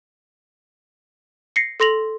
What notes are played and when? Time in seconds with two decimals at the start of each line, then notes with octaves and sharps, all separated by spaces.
1.56 A#6 C7 C#7
1.80 A4 C6 A#6 F7 F#7